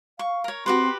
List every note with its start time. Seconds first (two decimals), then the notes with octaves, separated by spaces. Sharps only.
0.19 F5 C#6
0.44 A#4 C#5
0.66 C4 F#4 G4 B4 C6